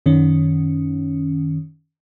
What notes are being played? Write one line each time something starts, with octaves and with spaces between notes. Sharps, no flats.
F#2 D#3 C#4